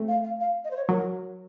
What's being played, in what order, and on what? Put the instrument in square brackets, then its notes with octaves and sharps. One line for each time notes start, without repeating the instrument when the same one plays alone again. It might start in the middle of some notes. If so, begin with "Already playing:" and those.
Already playing: [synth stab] A3 C4
[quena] F5
F5
F5
D#5
C5
C#5
[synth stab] F#3 [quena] A#4